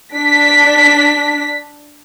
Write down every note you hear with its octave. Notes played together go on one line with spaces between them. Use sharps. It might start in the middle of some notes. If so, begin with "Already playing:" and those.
D4 B6